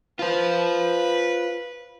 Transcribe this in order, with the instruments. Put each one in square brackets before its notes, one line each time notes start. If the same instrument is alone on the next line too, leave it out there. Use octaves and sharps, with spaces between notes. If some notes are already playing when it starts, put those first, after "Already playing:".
[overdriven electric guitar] F4 C5 [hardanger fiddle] B4